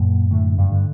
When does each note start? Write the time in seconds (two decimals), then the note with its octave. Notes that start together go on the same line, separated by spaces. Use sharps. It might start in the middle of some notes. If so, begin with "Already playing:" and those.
Already playing: F#2 A#2 A#3
0.31 A2 D3 A3
0.58 G2 G3
0.72 D3